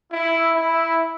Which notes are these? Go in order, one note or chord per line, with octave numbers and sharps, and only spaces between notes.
E4
E4